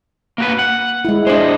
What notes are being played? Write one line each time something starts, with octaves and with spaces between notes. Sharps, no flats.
A#3 F#4 B4
F#5
G#3 E4
G#3 D4 C5 D#5